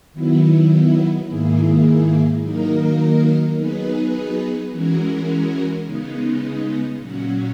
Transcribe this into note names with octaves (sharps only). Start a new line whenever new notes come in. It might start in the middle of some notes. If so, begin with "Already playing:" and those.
D#3 F#3 B3 E4
G#2 D#3 A#3 E4 G#4
D#3 F#3 A#3 D#4 A#4
F#3 B3 D#4 G#4 B4
E3 G#3 C#4 F#4 A#4
C#3 G#3 B3 D#4
A#2 F#3 C#4 F#4